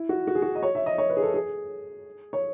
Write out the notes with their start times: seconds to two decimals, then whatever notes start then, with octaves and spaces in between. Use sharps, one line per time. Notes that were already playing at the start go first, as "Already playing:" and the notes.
Already playing: E4
0.09 F#4
0.27 F#4
0.35 G#4
0.42 F#4
0.55 D#5
0.63 C#5
0.75 E5
0.86 D#5
0.98 C#5
1.10 B4
1.17 G#4
1.23 A4
1.34 G#4
2.33 C#5